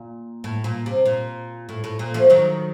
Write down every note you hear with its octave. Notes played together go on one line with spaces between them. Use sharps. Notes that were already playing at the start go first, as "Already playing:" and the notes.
Already playing: A#2
A2
A#2
C3
A#2
A2
A2
A#2
F3 A3
D#3 F#3